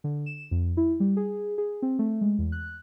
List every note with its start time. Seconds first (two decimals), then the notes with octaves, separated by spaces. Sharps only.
0.04 D3
0.26 E7
0.51 F2
0.77 E4
1.00 G3
1.17 G#4
1.58 G#4
1.82 C4
1.99 A3
2.21 G#3
2.39 E2
2.52 F#6